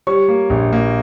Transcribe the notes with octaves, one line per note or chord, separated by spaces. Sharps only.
G3 C#5 C#6
A#3
A#1
A#3